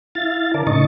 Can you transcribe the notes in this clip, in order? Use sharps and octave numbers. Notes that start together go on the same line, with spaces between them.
E4 F5 A6
D3 A#4 D5 A5
A2 C#3 D#4 D#5 C#6 A6